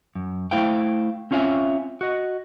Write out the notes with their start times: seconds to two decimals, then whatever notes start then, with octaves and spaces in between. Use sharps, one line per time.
0.15 F#2
0.51 A3 E4 C5 F5 G5
1.31 C4 C#4 F4 C#5 E5 G#5
2.01 F#4 D#5